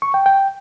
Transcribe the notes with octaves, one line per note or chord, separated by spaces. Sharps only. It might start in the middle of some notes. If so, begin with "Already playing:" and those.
C#6
G5
G5